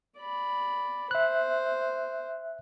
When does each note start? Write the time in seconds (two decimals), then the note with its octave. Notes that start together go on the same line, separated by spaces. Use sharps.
0.20 D5 B5
1.11 C5 E5 F#6